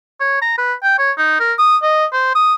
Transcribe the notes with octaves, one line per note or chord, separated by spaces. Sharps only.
C#5
A#5
B4
G5
C#5
D#4
A#4
D#6
D#5
C5
D#6